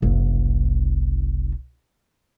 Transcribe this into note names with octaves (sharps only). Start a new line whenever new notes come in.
F#1 C2